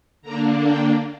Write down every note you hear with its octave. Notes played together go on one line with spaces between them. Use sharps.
D3 A#3 D4 A#5
G5